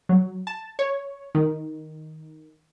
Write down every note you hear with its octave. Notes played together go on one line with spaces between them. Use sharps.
F#3
A5
C#5
D#3